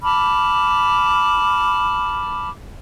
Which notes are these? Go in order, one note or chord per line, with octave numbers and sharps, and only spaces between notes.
A5 B5 D6 F6